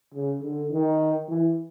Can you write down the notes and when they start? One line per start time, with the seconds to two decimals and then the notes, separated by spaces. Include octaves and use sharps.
0.14 C#3
0.42 D3
0.71 D#3
1.28 E3